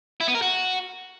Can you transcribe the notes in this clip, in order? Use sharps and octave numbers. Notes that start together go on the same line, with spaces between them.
E4
B3
A#4
F#4